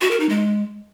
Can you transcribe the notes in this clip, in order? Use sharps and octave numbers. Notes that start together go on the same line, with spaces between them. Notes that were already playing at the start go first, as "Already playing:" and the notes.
F#4
A#4
D#4
G#3